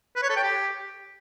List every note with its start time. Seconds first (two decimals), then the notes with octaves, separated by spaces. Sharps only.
0.16 B4
0.23 C#5
0.30 A4
0.36 G5
0.43 G4